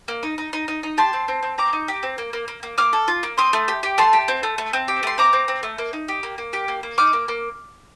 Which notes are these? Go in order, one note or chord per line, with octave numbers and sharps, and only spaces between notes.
A#3
D#4
D#4
D#4
D#4
D#4
G4 A5 C6
C4
C4
C4
C4 A#5 D6
D#4
G4
C4
A#3
A#3
A#3
A#3
A#3 D6 F6
A4
F4
A#3
C4 C6 D#6
A3
G4
G4
A3 A5 C6
G4
C4
A3
A3
C4
G4
A3 C6
C4 A#5 D6
C4
C4
A3
A#3
D#4
G4
A#3
A#3
G4
A#3
A#3
D#4 D6 F6
A#3
A#3